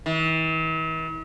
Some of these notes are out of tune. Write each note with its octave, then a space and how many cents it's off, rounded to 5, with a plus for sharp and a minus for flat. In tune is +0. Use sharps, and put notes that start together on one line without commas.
E3 -45